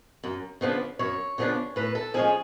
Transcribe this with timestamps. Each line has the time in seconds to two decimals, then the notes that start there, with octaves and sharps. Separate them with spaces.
0.24 F#2
0.61 C#3 F3 B3 D4
0.99 F#2 C#5
1.38 C#3 F3 B3 D4
1.76 A2 B4
1.95 A4
2.14 F3 G#3 C#4 G#4